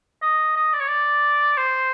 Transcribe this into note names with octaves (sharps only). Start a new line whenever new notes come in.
D#5
D#5
D5
C#5
D5
C5